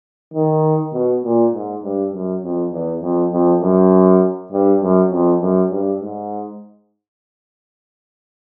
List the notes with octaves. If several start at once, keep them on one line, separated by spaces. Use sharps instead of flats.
D#3
B2
A#2
G#2
G2
F#2
F2
E2
F2
F2
F#2
G2
F#2
F2
F#2
G2
G#2